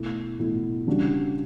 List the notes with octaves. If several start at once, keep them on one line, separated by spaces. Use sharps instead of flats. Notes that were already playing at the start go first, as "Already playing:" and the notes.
Already playing: B2 A3 E4
B2 A3 E4
C#3 G3 D4 F#4